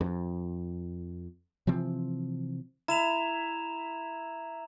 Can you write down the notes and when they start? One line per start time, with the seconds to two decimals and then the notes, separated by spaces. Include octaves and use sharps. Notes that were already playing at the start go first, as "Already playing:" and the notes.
0.01 F2
1.67 C3 E3 F3 C4
2.88 E4 A#5 E7 F7